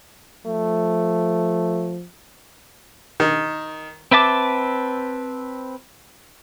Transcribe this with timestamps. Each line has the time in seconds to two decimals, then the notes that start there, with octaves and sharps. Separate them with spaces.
0.46 F3 A3
3.20 D#3
4.11 C4 B4 E5 A5 D6